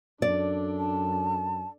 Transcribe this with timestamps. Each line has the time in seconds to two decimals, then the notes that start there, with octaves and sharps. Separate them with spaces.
0.22 F#2 D4 A4 D5
0.79 A5